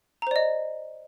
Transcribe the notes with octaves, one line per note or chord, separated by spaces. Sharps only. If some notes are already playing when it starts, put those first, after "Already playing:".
C5 D5 D#5 A#5